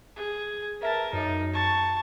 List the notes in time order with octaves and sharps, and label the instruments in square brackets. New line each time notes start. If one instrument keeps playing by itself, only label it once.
[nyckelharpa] G#4
[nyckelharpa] A#4 A5 [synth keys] B4 E5 B6
[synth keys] F#2 [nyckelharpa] D#4
[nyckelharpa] A5 C#6